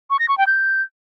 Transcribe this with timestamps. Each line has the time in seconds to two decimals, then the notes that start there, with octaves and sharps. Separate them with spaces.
0.10 C#6
0.19 A#6
0.28 C#6
0.38 G5
0.47 G6